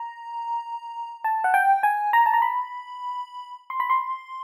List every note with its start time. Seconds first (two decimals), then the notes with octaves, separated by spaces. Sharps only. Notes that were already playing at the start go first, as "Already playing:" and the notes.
Already playing: A#5
1.24 A5
1.44 F#5
1.54 G5
1.83 G#5
2.13 A#5
2.26 A5
2.34 A#5
2.42 B5
3.70 C6
3.80 B5
3.90 C6